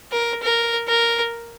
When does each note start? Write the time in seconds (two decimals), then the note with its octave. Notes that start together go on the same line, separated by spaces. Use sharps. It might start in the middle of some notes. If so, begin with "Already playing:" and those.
0.12 A#4
0.42 A#4
0.88 A#4